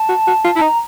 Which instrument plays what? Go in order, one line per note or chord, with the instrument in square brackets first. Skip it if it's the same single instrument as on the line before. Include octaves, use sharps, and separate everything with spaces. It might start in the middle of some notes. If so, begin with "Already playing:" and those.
Already playing: [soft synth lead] A5
[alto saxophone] F#4
F#4
F4
[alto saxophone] E4 [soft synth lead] A5
[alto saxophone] D#4 [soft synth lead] A#5